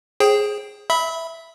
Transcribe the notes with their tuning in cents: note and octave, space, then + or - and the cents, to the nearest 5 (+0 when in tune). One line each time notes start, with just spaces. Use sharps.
G#4 +0 C5 +35 G5 +0
E5 +0 B5 +0 E6 -35